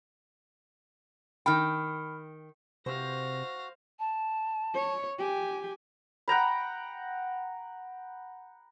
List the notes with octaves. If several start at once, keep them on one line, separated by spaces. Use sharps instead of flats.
D#3 G5 B5 F6
C3 F#4 C5 F5 A#6
A5
C#5
G4 G5 G#5
F#5 G5 A#5 B5